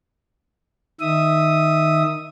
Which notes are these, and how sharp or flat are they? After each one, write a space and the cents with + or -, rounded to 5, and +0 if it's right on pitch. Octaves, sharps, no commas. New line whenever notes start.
D#3 +0 E5 -5 D#6 +0